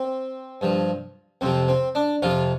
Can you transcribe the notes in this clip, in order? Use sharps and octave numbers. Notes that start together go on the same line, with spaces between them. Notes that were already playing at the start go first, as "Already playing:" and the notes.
Already playing: C4
G2 F3
F2 C3 F3 C4
C4
D4
F2 C3 F3 F4